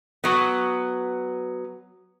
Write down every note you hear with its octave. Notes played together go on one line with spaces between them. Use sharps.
F#3 B3